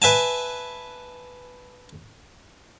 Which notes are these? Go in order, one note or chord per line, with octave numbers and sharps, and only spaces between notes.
B4 E5 G#5 A5